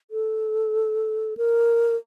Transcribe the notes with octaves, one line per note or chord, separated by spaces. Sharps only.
A4
A#4